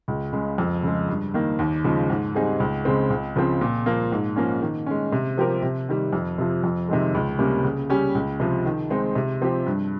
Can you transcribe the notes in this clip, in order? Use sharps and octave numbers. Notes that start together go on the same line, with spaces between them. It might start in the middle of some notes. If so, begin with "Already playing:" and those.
C#2
C#3 G#3
F2
C#3 G#3
G2
D#3 A#3
D#2
C#3 F3 G#3
G#2
G3 C4 D#4 G#4
C#2
C#3 G#3 C4
C#2
C#3 F3 C4
A#2
F3 A#3
G#2
F3 A#3 C#4
D#3
G#3 C#4
C3
F3 C4 G4 A#4
C3
D#3 G3
F2
C3 F3
F2
C3 D#3 G#3
C#2
C3 G3 A#3 C#4
C#3
G3 C#4 G4
C#2
C3 F3
D#3
G#3 C4 D#4
C3
F3 C4 G4
G2